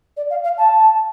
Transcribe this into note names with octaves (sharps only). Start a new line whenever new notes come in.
D5
F5
F5
A5